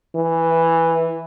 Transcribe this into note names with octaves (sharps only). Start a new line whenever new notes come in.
E3